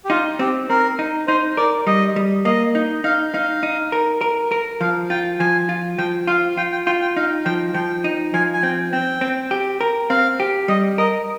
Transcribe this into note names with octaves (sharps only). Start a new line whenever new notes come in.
G4
D#4 F4
C4 G4
C4 A#4
D#4
D#4 C5
A#4 D5
G3 D#5
G3
A#3 D#5
D#4
D#4 F5
D#4 F5
D#4
A#4
A#4
A#4
F3 F5
F4 G5
F3 G#5
F4
F3 G5
F4 F5
F4 G5
G5
F4 G5
G5
D#4 F5
F3 G5
F3 G5
D#4
F3 G#5
G#5
C4 G5
C4 G5
C4
G4
A#4
C4 F5
G4
G3 D#5
A#4 D#5